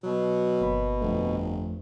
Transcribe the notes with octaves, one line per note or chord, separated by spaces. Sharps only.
B2 F#3
G1 A#3 B5
G1 F2 F3 A3